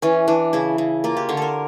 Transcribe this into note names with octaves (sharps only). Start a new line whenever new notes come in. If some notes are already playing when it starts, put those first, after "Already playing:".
E3 C#4
E3 D4
C#3 E4
C#3
A#3 F4
G4
D3 C#5
A4 A#4